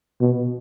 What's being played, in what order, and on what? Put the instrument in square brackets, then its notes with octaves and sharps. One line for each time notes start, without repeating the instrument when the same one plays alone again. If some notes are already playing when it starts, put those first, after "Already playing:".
[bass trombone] B2